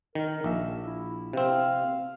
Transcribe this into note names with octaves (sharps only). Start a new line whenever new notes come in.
D#3 A#4
A#1 E5
E4
C3 C4 F5